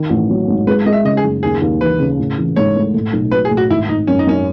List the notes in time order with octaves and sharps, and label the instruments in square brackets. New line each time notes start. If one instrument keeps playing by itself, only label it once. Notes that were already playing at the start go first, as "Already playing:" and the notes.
Already playing: [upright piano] D#3
A1
F#3
G#2
[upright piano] G#3 [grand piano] B4
[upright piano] G#3 [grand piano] D#5
[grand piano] E5
[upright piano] C#3 [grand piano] D#5
[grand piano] G#4
[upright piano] F#1
[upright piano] D#2 [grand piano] G#4
[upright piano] D#2
[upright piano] E3 [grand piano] B4
[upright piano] C#3
A1
E3
[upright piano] G#2 [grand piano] C#5
[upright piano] A3
A2
B1
[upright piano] F#3 [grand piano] B4
[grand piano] G#4
[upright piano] A2
[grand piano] F#4
[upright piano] G#1 [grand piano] E4
[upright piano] G#1 [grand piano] D#4
[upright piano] F#2 [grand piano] C#4
[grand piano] D#4
[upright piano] F#2 [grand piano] C#4